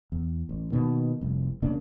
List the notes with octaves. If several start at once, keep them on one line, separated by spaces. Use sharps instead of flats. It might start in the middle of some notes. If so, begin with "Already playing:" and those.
E2
A1
B2 D#3 A#3
F1 C2
E1 C#3 A#3 D4